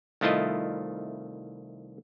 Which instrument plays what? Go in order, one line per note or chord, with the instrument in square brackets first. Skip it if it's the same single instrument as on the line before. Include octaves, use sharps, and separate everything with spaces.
[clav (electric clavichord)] C2 D#3 A3 E4 F4 D#5